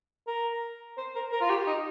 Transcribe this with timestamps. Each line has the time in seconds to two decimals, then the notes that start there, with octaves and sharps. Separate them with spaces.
0.27 A#4
0.97 C5
1.15 A#4
1.32 A#4
1.41 F4
1.49 G4
1.67 D#4